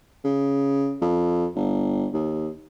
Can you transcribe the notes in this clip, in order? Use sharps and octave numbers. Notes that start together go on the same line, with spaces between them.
C#3
F2
G1
D#2